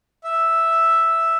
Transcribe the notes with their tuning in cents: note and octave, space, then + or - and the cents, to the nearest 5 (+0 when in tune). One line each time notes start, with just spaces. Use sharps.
E5 +0